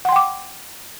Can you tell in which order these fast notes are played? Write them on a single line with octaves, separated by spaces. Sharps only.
F#5 C6 G5 D6